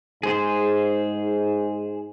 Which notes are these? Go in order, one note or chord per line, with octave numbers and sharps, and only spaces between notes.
G#2 G#4 C5